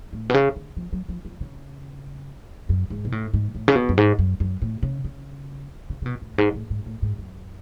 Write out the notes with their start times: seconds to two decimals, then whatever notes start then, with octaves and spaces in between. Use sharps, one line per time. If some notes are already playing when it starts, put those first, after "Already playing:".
0.13 A2
0.30 B2
0.34 C#3
0.56 D3
0.77 F3
0.93 F#3
1.09 F3
1.25 F3
1.41 C#3
2.69 F#2
2.90 G#2
3.05 B2
3.12 A2
3.34 G#2
3.55 A2
3.68 C#3
3.75 B2
3.89 F#2
3.97 G#2
4.19 F#2
4.40 F#2
4.62 A2
4.83 C#3
5.04 C#3
5.90 C#3
6.02 C#3
6.06 B2
6.22 A2
6.34 F#2
6.38 G#2
6.54 A2
6.70 G#2
6.86 A2
7.02 G#2
7.18 F#2